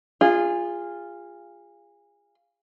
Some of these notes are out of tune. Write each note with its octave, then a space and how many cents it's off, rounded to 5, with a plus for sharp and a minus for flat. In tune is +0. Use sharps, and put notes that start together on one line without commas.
F4 -5 G#4 -25